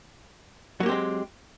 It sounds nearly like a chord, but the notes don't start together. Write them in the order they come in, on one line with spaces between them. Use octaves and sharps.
F#3 A#3 G4 C4 G#3